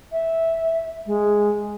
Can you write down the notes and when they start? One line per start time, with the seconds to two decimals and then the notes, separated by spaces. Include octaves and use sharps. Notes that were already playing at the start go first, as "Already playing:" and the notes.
0.12 E5
1.06 G#3